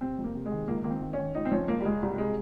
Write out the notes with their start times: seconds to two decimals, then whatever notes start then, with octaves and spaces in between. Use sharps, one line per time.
0.01 C3 C4
0.19 F2
0.24 A#3
0.35 C3
0.46 G#3
0.52 D#3
0.68 C#2 A#3
0.84 D#3 A#3
0.90 C4
1.02 D#3
1.13 D#3 C#4
1.35 C#2 D#4
1.45 C4
1.51 F3 C#4
1.68 C#2 A#3
1.80 G3
1.85 C#2 G#3
2.02 C2 G3
2.18 C3 G#3